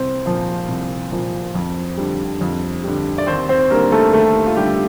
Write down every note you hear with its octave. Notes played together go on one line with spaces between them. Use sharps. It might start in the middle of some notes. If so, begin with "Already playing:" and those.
Already playing: C2 C4 C5
A#2 F3
C2
A#2 F3
F2
D3 G3
F2
D3 G3
D5
D#2 C4 C5
C4 C5
D3 G3 A#3 A#4
A3 A4
D#2 A3 A4
F4
D3 G3 G4